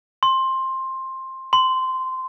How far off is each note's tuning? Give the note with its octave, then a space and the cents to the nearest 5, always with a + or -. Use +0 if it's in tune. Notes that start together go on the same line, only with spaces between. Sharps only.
C6 +15
C6 -15